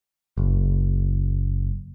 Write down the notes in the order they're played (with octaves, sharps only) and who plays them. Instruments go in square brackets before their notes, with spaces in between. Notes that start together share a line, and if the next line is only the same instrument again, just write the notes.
[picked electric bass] F#1